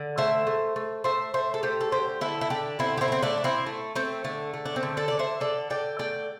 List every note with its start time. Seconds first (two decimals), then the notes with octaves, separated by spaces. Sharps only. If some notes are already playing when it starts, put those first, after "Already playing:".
Already playing: D3
0.18 A3 C5 E5
0.47 A3
0.76 A3
1.04 A3 C5 E5
1.34 A3 C5 E5
1.54 A4
1.63 A3 G4 C5
1.81 A4
1.92 D3 G4 C5
2.21 D3 E4 A4
2.41 E4
2.50 D3 D4 G4
2.79 D3 C4 E4
2.98 G4
3.01 C4 E4
3.08 A3
3.12 C4
3.23 A3 D4
3.38 A3
3.44 C4 E4
3.66 A3
3.95 A3 C4
4.24 D3 A3
4.54 A3
4.66 D4
4.76 C4
4.83 D3
4.97 A4 D5
5.08 D3 D5
5.19 C5 E5
5.40 D3 A4 D5
5.70 D3 D5 G5
5.99 A3 D5 G5